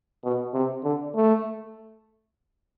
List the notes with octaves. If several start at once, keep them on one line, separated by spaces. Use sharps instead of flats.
B2
C3
D3
A3